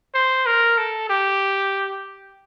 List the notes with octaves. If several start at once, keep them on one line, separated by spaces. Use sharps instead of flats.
C5
A#4
A4
G4